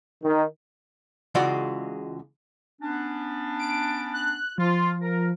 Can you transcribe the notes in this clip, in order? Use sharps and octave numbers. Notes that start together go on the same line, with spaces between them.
D#3
C#2 E3 G#3 F4 F#4 D5
B3 C#4 D4
D7
F#6
F3 F4
A#4